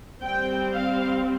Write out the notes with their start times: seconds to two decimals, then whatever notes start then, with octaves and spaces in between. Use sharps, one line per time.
0.23 G3 C4 G5
0.73 F5